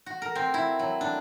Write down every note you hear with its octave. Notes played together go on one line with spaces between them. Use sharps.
F#4
A#4
C4
E4
F#3
D4